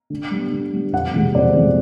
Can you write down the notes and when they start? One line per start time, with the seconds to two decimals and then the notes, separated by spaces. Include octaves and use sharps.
0.10 D3
0.31 G3 B3
0.52 D3
0.73 G3 B3
0.93 F2 F#5
1.13 C3 E3 G#3
1.35 F2 D5
1.54 C3 E3 G#3